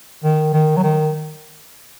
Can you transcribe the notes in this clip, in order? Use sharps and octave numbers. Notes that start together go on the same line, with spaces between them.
D#3
D#3
F#3
D#3